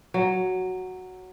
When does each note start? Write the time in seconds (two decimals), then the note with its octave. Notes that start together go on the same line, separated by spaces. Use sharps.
0.14 F#3